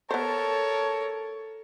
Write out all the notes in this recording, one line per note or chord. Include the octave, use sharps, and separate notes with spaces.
B3 A4 A#4 C5 C#5 A5